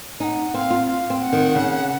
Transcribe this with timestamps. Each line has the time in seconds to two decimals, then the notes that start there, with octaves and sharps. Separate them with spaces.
0.20 D#4 G#5
0.24 F#5
0.54 C4 F5
0.70 F4
0.87 F5
1.10 C4
1.21 F#5
1.33 D#3
1.55 C#3